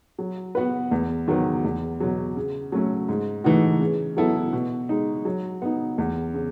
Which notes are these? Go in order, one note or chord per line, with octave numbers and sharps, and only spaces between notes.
F#3
B3 F#4 B4
E2
D#3 F#3 B3
E2
B2 F#3
C#3
F#3 A3 C#4
G#2
E3 A3 D#4 F#4
C#3
F#3 B3 E4 A4
B2
G#3 D#4
F#3
B3 D#4
E2
C#3